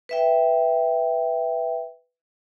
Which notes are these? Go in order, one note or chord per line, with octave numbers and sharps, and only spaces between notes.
B4 E5 G5